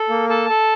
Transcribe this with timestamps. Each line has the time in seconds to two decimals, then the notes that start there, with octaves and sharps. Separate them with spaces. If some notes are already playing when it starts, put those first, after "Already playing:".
Already playing: A4
0.09 A#3
0.29 A4 A5
0.49 A4